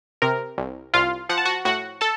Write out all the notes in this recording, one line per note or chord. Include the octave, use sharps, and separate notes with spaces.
C3 A#4
C2
C2 F4 F5
F3 F#5
A5
F#4 F#5
A2 F#4 F#5
A4 A5